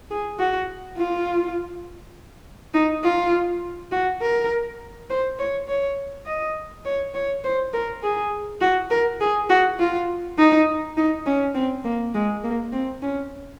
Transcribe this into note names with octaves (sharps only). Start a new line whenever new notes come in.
G#4
F#4
F4
D#4
F4
F#4
A#4
C5
C#5
C#5
D#5
C#5
C#5
C5
A#4
G#4
F#4
A#4
G#4
F#4
F4
D#4
D#4
C#4
C4
A#3
G#3
A#3
C4
C#4